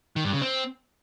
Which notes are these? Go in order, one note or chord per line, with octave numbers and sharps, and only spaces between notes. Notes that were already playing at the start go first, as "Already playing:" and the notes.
D#3
G2
C#3
C4